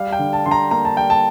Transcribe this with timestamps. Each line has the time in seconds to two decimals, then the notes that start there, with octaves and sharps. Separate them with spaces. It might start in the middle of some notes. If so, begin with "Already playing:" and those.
Already playing: G3 F5
0.12 G5
0.19 D3
0.33 A5
0.46 D3 C6
0.51 A#5
0.71 A#3 A#5
0.85 A5
0.97 G3 G5
1.10 A5